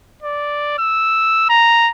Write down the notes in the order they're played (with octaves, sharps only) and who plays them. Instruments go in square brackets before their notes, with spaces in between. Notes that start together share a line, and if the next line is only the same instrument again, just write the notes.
[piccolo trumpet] D5
E6
A#5